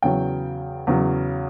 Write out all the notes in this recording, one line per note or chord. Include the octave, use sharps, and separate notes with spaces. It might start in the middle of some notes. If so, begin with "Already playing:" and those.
E2 C#3 F#3 G5
E2 C#3 F#3